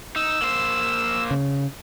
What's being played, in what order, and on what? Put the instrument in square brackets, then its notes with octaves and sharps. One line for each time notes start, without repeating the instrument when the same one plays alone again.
[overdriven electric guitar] D#4 [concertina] E6
[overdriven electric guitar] A#3 C5
[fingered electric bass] C#3